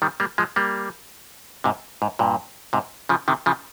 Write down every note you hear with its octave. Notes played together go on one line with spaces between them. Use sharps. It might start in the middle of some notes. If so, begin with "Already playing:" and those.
D#3 G3
G3 A#3
F3 G#3
G3 A#3
G#2 C3
G#2
G2 A#2
G#2 C3
C#3 F3
C3 D#3
C#3 F3